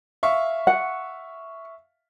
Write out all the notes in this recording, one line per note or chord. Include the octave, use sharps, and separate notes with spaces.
E5 F5 C#6
F#5